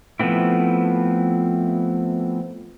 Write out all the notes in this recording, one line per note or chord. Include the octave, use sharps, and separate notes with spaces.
F3 A3 B3 C4 E4